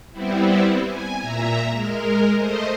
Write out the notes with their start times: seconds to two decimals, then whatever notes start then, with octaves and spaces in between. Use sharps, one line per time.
0.12 G3 B3 C4 E4
0.87 G#5
1.18 A#2 E5 A#5
1.72 G#3 A#4
2.35 A3 C5 D#5